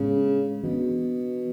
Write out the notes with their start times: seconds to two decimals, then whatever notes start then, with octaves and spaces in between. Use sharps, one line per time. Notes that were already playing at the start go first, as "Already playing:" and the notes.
Already playing: A2 C#3 G#3 B3 D4
0.63 B2 E3 B3 D4